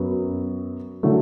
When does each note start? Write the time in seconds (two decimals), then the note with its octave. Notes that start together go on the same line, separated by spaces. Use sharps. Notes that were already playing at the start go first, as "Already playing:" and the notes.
Already playing: F#2 F#3 B3
1.03 D3 F#3 A3